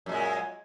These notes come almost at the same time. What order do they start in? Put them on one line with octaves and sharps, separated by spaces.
F#2 A#2 G#3